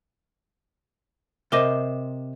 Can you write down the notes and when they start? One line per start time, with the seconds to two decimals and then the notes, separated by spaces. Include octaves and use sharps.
1.52 C3 A#4 C5 D#5 D6 A#6